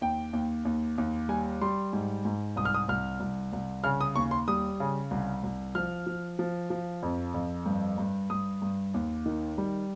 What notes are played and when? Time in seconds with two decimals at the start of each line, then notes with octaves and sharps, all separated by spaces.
0.01 D#2 G5
0.33 D#2
0.65 D#2
0.98 D#2
1.29 G3 G#5
1.61 G3 C6
1.93 G#2
2.25 G#2
2.56 C2 D#6
2.65 F6
2.74 D#6
2.89 C2 F6
3.20 C2
3.53 C2
3.84 C#3 F6
4.01 D#6
4.16 D#2 C#6
4.31 C6
4.48 G3 D#6
4.80 C#3
5.11 C2
5.44 C2
5.75 F3 F6
6.07 F3
6.39 F3
6.70 F3
7.03 F2
7.34 F2
7.66 G2
7.98 G2
8.30 G2 D#6
8.62 G2
8.94 D#2
9.26 D#3
9.58 G3